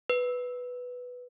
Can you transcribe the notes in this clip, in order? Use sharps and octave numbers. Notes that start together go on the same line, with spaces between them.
B4